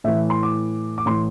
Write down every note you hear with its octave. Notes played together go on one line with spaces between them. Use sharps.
A2 E3 E5
C6
D6
D6
A2 E3 C6